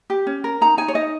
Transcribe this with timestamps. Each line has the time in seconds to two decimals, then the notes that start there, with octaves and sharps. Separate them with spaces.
0.10 G4
0.27 C#4
0.44 A#4
0.61 D#4 A#5
0.77 D#4 G#5
0.88 C#5
0.95 D#4 D#5